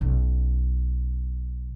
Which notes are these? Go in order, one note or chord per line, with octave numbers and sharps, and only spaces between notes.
B1 C#4